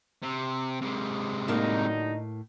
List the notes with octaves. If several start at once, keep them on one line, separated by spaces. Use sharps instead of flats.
C3
C3 G#3
A2 D3 F#3 A#3 D#4